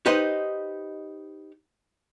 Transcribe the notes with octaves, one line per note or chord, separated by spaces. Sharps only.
D#4 G4 B4 C5 D#5